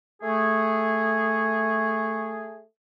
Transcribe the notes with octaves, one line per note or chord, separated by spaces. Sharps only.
A3 G#4